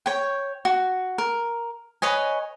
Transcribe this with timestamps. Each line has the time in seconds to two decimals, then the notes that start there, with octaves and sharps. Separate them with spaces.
0.06 C#5 G5
0.65 F#4
1.18 A#4
2.02 B4 C#5 D#5 G#5